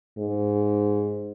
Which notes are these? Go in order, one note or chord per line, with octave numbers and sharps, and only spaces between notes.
G#2